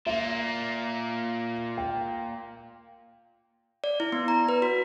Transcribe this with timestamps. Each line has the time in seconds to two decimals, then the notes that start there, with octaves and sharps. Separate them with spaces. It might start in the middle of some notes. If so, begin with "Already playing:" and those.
0.06 A#2 A#3 E5
1.78 G5
3.84 D5
4.00 E4
4.12 B3
4.28 A#5
4.49 B4
4.62 F#4